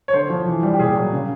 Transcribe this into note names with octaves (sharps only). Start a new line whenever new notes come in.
C#5
D3 C5
F3
E3
G3
G4
A#2 G#4
F#3
C#3